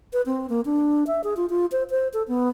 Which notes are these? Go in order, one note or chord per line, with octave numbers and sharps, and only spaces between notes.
B4
C4
A#3
D4
E5
G#4
F4
F4
C5
C5
A4
B3